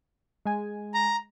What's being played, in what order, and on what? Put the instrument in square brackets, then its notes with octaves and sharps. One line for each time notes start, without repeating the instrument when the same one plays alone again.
[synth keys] G#3 G#5
[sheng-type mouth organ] A#5